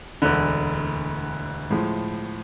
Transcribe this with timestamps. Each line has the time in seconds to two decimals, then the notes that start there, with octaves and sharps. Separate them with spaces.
0.22 E1 D2 D3
1.71 A2 F3 G#3